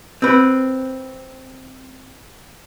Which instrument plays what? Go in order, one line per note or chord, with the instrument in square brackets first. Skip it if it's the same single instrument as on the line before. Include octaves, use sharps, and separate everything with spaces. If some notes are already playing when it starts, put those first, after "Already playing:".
[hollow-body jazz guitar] C4 B4